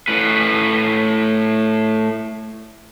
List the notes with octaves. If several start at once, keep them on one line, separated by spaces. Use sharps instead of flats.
A2 B4